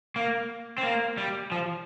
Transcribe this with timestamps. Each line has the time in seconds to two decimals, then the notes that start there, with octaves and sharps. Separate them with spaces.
0.16 A#3
0.78 C4
0.83 A#3
1.18 G3
1.52 F3